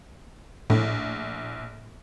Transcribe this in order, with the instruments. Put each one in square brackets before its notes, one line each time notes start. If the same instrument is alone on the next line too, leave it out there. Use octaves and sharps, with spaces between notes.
[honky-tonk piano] A#1 [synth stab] A2